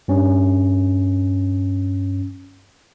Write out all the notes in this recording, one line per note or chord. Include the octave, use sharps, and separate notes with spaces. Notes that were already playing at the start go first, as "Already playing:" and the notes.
G2 C#4